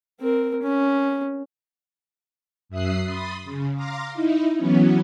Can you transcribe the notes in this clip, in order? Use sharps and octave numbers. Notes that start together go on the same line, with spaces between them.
C4 A#4
C#4
F#2 E5 D#6 F#6 C7
B5 C6 D#6 A6
C#3
F5 A#5 C6 D6 F6 A#6
D#4 E4
E3 F#3 B3 C#4